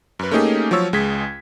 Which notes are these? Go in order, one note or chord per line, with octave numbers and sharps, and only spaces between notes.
F#2 B4
A3 A#3 C#4 D#4 G4 G#4
F3 F#3 F4 C#5 E6
C#2 G#3 G#4 G#6 B6